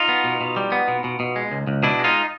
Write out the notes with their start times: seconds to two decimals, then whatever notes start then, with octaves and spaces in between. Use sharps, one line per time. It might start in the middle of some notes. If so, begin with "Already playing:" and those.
Already playing: D#4 F4
0.09 B3
0.24 B2
0.41 B2
0.56 G3
0.72 B3
0.88 B2
1.04 B2
1.20 B2
1.36 G#3
1.52 C#2
1.67 C#2
1.83 B2 D4 E4
1.99 G#3
2.04 D#4 F4